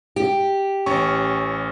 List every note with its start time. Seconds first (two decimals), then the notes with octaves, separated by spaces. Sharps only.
0.16 G4
0.86 A1 C#4 C#6